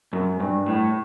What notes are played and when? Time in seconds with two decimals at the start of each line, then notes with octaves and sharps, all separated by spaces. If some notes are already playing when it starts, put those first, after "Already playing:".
0.13 F#2
0.40 G2
0.66 A2